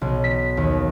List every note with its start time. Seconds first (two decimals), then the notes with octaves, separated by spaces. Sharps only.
0.01 B1
0.24 B6
0.57 D#2